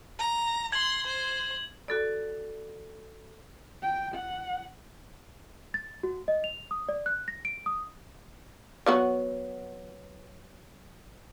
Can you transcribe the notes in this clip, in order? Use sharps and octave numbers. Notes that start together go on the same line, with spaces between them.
A#5
C6 G#6 F#7
C5
F#4 A4 D5
G5
F#5
A6
F#4
D#5
F7
D#6
D5
F#6
A#6
D7
D#6
F#3 B3 F#4